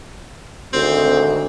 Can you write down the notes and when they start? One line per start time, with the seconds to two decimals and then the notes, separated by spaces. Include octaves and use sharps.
0.73 G#1 D2 C4